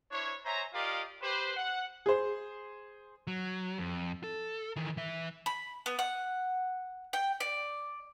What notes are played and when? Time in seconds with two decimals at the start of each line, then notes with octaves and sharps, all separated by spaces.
0.11 D4 E4 C5 C#5
0.45 C5 C#5 E5 G#5 A#5
0.74 F4 G4 A#4 D5 D#5 F5
1.22 G4 B4 C5
1.57 F#5
2.06 G#4 C5
3.27 F#3
3.78 F2
4.24 A4
4.76 D#3 E3
4.97 E3 E5
5.46 B5
5.86 B3
5.99 F#5
7.13 G5
7.40 D5